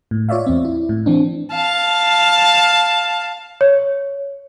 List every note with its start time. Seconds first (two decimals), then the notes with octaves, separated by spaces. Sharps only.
0.11 A2
0.29 F4 C#5 D5 E5 F5
0.46 E2 C4
0.65 E4
0.89 A2
1.06 E3 C4 D4
1.52 F5 A5
3.61 C#5